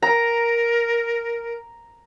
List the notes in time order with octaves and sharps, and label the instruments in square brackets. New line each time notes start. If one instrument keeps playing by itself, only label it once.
[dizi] A#4 [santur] A#5